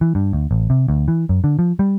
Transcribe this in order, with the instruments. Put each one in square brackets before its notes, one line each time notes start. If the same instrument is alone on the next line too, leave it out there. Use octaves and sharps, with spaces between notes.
[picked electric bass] E3
G2
D2
A1
C3
D2
E3
F#2
D3
F3
G3